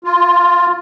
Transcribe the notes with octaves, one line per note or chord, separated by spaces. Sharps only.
F4